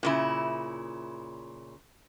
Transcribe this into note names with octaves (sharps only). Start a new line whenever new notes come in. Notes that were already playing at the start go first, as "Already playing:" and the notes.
A#2 C#3 E4